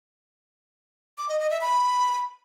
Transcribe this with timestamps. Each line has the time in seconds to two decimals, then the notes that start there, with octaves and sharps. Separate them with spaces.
1.18 D6
1.29 D#5
1.40 D#5
1.50 E5
1.61 B5